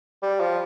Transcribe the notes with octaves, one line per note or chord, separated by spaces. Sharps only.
G3
F3